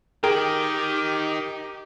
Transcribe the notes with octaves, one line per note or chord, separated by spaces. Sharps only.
D#3 G4 G#4 A#4 G5